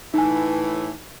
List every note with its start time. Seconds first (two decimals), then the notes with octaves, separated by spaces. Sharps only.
0.14 A2 E3 D#4 G#5